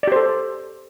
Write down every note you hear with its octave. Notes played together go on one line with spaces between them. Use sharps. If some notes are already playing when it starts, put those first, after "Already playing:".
G4 A4 C5 D5